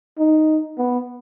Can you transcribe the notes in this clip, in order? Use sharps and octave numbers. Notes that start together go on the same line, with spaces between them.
D#4
B3